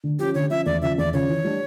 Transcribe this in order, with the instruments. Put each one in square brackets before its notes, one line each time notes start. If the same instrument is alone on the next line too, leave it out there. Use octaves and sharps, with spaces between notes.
[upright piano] D3
[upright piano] F3 C#4 [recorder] G4
[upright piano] D3 [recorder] C#5
[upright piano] F3 C#4 [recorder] E5
[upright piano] E2 [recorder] D5
[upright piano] C#3 F3 [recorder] E5
[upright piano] E2 [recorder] D5
[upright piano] C#3 F3 [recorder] C#5
[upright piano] E3
G3 D4